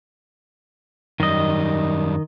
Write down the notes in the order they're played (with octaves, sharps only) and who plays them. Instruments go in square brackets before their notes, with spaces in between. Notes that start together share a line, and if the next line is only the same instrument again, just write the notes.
[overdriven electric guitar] F#2 G3 [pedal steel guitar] D#3 D#5